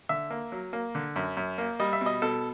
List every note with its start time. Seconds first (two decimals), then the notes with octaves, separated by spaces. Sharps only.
0.09 D3 E5
0.31 A#3
0.52 F#3
0.73 A#3
0.95 D3
1.16 F#2
1.37 F#2
1.58 A#3
1.80 G3 D#5
1.93 E5
2.01 B2
2.06 D#5
2.22 B2 A4